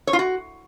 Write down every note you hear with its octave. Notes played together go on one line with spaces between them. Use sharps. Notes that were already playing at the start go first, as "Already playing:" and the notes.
C#5
F4
F#4